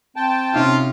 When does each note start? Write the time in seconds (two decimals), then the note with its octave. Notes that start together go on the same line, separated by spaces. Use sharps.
0.16 C4 G5 A5
0.54 C3 C#4 D#4 F4